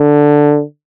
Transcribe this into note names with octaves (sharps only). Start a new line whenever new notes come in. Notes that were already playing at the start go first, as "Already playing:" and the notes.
Already playing: D3